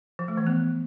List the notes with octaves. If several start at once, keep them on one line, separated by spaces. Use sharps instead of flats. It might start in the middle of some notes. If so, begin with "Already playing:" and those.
F3
A3
E3
B3